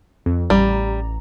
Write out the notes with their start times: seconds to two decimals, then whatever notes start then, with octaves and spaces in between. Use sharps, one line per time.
0.26 F2
0.50 A1 G3 A#5